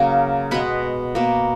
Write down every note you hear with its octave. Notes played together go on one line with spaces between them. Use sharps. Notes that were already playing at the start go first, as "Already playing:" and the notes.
Already playing: C#3 F#3 A#3 A#4
B2 G#3 B3 B4
B2 A#3